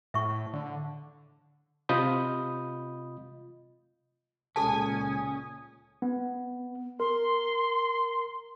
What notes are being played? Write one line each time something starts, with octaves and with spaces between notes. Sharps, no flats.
A2 E5 C#6
D3
C3 F4 D#5 B5 D#6 G6
C#2 A#2 C#3 C#4 A4 G#5 A5 D#6
B3
A#4 C6